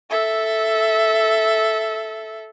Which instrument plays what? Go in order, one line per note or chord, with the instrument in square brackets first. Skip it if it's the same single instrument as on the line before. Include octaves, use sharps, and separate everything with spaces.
[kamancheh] A4 E5